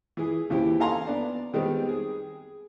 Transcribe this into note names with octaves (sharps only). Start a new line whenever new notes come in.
E3 G#4
D#2 C#3 E3 C4 E4 G4
D#4 A4 F5 G#5 A#5 C6
B3 D4
D#3 G3 G#3 B3 C4 D#4
G#4